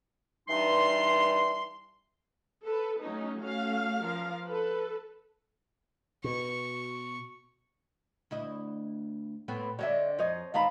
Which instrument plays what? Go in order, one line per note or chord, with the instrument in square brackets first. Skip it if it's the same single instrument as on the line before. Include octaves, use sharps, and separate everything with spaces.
[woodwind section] G2 E3 G3 D#4 C6
[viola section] A4 B4
F#3 A3 C#4 D#4
A3 C#4 F#4 F5
F3 A#4 F5
A4 B4
[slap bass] B2 [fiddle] C#6
[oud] D2 E4 D#5
A2 B3 C4
[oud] D3 C4 D4 [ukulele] C#5 D#5 E5
[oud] F2 [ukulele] C5 C#5 D#5
[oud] D#3 C4 D#5 [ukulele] F5 A#5 B5